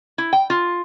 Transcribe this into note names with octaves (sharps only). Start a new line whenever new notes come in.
E4
G5
F4